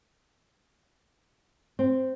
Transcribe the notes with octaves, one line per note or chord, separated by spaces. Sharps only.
C4